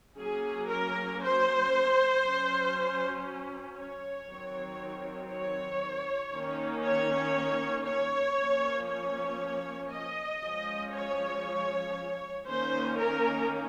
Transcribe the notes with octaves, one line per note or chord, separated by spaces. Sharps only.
F#3 A#3 C#4 G#4
A#4
C5
F#3 C#4
C#5
D#3 F#3 C4
C#5
D#3 A#3 C#4
C#5
C#5
F3 A#3 C#4
C#5
D#5
F3 G#3 C#4
C#5
D#3 A#3 C#4 C5
A#4